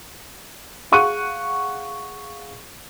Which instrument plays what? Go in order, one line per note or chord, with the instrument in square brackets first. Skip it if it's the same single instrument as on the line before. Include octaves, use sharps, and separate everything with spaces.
[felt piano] G#4 F5 F#5 C#6 F#6 D#7